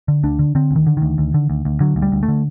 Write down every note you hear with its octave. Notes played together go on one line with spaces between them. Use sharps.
D3
D2 D4
D3
D3 C4
D2
D#3
D3
D2 D#3
D2
D3
D2
D2
D3 F#3
D2
G3
D2
A3
D3